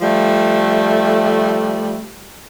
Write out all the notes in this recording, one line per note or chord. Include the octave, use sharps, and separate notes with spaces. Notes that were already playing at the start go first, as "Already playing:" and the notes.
F3 G3 A3